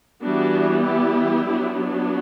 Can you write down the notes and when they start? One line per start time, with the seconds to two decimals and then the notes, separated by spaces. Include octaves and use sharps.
0.22 E3 G3 B3 D4 F#4
0.84 E4 G4
1.47 F#3 B3 D4